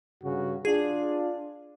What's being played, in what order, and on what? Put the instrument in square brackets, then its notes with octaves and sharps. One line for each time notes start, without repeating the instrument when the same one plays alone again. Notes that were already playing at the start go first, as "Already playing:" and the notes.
[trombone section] G2 C#3 F#4
[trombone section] D4 F4 [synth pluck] G#4